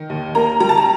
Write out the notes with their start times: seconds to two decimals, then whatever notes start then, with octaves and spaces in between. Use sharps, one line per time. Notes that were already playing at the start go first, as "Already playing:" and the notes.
Already playing: D#3
0.10 D#2
0.35 A#3 A#5
0.60 G3 A#5
0.69 A5
0.77 A#5